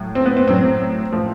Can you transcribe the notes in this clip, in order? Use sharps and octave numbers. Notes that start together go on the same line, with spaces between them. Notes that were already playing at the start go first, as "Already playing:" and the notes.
Already playing: A2 F#3
C4
B3
C4
A2 F#3 C4
A2 F3